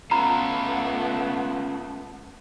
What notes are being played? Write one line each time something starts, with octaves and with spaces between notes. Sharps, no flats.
A3 B3 C#4 F4 F5 A#5 B5